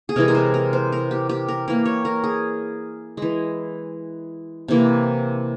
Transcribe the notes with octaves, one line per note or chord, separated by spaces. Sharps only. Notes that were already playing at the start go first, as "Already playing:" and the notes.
G#4
C3 E3 G#3 A#4
A#4
C5
A#4
C5
A#4
G4
G4
A#4
E3 A#3 A#4
C#5
A#4
G#4
E3 G#3
C3 E3 A#3